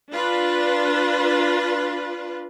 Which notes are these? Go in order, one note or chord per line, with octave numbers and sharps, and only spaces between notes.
D4 F4 B4